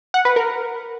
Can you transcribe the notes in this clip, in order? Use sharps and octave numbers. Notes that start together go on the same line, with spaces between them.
F#5
B4
A#4